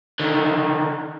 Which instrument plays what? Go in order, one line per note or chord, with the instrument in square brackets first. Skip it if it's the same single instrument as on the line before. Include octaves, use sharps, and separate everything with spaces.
[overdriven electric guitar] D3 D#3